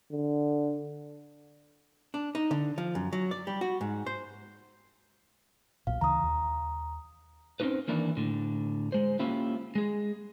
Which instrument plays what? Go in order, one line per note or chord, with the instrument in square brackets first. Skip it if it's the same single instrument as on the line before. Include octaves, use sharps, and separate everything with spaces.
[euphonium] D3
[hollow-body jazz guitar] D4
D#4
D3
F3
F#2
F#3
D5
G3
F#4
G#2
C5
[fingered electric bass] B1 A#2 [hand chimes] F5
[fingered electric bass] D2 C#3 E3 [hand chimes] A#5 D#6
[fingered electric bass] D#2
[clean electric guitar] C4 C#4 D#4 F4 B4
D#3 E3 A#3 D4 E4
A2 D3
G#3 C5
A#3 C#4 E4 F4 G4
G#3 G#4